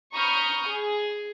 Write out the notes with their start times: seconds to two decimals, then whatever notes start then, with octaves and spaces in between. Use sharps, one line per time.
0.13 A#5 B5 C#6 D#6 F6 G6
0.68 G#4